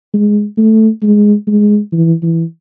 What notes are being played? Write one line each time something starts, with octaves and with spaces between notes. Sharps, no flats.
G#3
A3
G#3
G#3
E3
E3